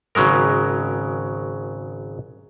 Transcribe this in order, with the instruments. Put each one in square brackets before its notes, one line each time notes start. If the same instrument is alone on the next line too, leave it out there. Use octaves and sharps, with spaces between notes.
[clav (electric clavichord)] G#1 C#3 F#3 G#3 A#4